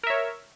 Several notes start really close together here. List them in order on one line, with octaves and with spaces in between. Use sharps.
A#4 E5 C#5